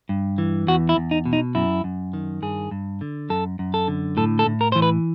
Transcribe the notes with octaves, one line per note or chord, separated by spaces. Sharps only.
G2
E3
E2 F#4
E4
E2
D#4
B2
D#4
F#2 E4
F#2
D#3
G2 G#4
G2
D3
F#2 A4
F#2
A4
D3
A2 A4
A4
A2
A#4
E3 C5
B4